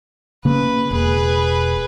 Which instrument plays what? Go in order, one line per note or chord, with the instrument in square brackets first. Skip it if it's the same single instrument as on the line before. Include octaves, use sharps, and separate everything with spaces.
[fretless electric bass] C#3 A#3 [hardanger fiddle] B4
[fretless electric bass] E1 [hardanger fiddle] G#4 B4